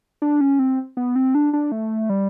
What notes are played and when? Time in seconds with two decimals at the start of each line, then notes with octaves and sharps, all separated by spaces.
0.22 D4
0.41 C#4
0.59 C4
0.97 B3
1.16 C4
1.35 D4
1.53 D4
1.72 A3
2.09 G3